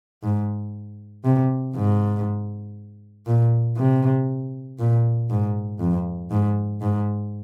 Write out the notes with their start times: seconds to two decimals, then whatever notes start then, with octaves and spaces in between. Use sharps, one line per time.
0.23 G#2
1.24 C3
1.75 G#2
3.27 A#2
3.77 C3
4.79 A#2
5.30 G#2
5.80 F2
6.31 G#2
6.81 G#2